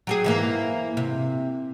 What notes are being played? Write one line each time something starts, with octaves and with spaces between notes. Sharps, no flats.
F#3 G4 G#4
G#2 E3 A#3
C3